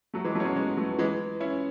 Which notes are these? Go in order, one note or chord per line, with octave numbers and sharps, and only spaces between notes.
F#3 A3
E3 G#3
F#3 A3
C#4
G#3 B3
G#3 B3
F#3 A3
E3 G#3
C#4 E4